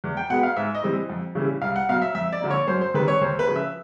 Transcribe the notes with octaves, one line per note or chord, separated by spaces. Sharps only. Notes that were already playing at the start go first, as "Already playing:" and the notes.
E2
G5
B2 G#3 B3 F#5
F5
G#2 E5
D#5
E3 G3 C4
F2
C#3 E3 G3
C2 F5
F#5
B2 F#3 F5
E5
F2 E5
D5
D3 F3 A#3
C#5
F#2 C5
C5
D#3 G3 C4 B4
C#5
D#2 C5
B4
C#3 F3
E5